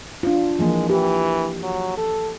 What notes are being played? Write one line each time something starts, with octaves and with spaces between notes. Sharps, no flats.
D4 F4
E3 F3 G#3 A#3
E3 G4
F#3
A4